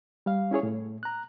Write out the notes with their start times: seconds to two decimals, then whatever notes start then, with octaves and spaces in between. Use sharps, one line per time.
0.26 G3 F5
0.51 C#4 E4 G#4 C#5
0.63 A2
1.03 A#5 F#6